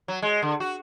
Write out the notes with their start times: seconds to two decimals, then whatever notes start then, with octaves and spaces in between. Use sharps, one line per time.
0.08 F#3
0.22 G#3
0.42 D3
0.60 F#4